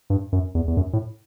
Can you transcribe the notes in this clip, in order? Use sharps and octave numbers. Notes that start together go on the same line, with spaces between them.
G2
F#2
E2
E2
F#2
A2